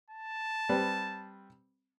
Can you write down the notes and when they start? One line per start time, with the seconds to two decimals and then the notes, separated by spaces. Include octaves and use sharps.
0.10 A5
0.69 G3 C4 B4